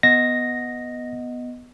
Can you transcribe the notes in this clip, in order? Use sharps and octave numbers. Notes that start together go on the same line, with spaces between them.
B3 D#5 A#6